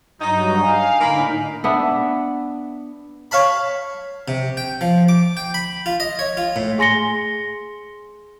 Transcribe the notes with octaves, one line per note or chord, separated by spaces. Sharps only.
G2 F#3 D#4
F5 G#5
A2 D3 A#3 D#4 A#4 B5
B3 D4 E5
C#5 F5 A5 B5
C3
G5
F3
D6
G5
B5
F4
D#5
C#5
F4
A2
G#4 G#5 C6 A#6 C#7 G7